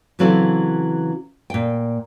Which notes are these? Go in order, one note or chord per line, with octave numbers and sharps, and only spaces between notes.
C#3 E3 F#3 C4 C#4 A4
A#2 G5